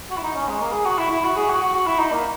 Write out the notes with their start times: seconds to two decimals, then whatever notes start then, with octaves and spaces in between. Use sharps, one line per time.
0.10 F#4
0.17 E4
0.23 D#4
0.35 C#4
0.48 G#3
0.61 A#3
0.73 G#4
0.85 F#4
0.98 E4
1.11 E4
1.24 F#4
1.36 G#4
1.49 F#4
1.62 F#4
1.74 F#4
1.86 E4
1.99 D#4
2.12 A#3